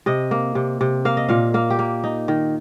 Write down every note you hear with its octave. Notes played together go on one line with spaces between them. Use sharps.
C3 D#5
A#3
C3
C3
A#3 F5
D#5
A#2 F5
A#3 F5
G4
A#3
D#4
D#3